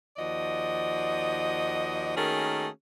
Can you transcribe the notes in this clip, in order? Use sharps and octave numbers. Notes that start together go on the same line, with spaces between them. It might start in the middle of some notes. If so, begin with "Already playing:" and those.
D#2 F3 F#4 D5 D#5
D#3 A3 A#3 C#4 F#4 G#4